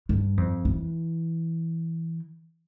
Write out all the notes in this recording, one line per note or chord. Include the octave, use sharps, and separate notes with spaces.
G2
F2
E3